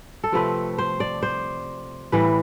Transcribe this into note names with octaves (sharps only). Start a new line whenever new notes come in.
A4
C3 F3 A3 C4 B4
C5
D5
C5
A2 E3 G3 B4